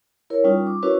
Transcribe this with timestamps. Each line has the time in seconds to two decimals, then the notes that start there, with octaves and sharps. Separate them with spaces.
0.30 E4 A#4 C#5
0.44 G3 C#4 D#4 F4
0.67 D6
0.83 C#4 E4 F#4 A#4 B4 C#5